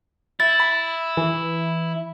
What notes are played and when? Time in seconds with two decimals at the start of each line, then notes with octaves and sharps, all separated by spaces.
0.40 E4 A6
0.60 B5
1.17 E3